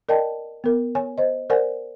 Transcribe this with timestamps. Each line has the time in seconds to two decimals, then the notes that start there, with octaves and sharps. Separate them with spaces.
0.09 A#4 D5 D#5 G5 A5
0.64 B3 A#4
0.95 C#5 G#5
1.18 C5 D#5
1.50 A#4 C5 D5 F#5 G#5